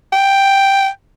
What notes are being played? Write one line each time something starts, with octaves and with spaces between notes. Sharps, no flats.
G5